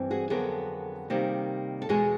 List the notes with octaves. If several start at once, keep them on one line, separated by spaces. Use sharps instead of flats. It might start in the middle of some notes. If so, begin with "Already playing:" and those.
Already playing: G2 E3 C4
F#4 G#4
F2 D3 F#3 B3 G#4 A#4
C3 D#3 G3 A#3
A4
E2 B2 G#3 F#4 G#4